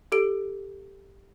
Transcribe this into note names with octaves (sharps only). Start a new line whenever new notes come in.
G4 A4 D7